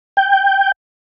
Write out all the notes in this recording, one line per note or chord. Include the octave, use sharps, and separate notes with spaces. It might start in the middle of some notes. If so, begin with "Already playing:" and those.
G5